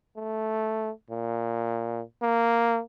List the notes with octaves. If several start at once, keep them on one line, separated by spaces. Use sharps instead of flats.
A3
A#2
A#3